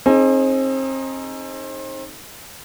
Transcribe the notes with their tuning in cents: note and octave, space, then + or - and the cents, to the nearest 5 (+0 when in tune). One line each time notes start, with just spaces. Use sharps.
C4 +35 D#4 +0 G#4 +20